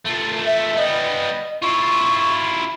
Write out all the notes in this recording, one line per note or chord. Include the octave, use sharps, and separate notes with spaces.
A3 F4
E5
G3 B3 D#5
E4 F4 C#6